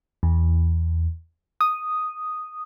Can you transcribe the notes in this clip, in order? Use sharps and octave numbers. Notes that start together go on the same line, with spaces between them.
E2
D#6